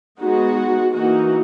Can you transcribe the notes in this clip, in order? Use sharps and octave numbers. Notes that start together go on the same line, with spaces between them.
G#3 B3 D#4 F#4
E3 A#3 D#4 F#4